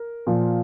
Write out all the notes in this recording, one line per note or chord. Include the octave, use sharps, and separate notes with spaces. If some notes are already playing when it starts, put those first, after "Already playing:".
Already playing: A#4
A#2 F3